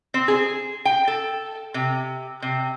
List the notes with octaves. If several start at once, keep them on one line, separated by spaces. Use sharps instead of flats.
C4
G#4
G5
A4
C3
C3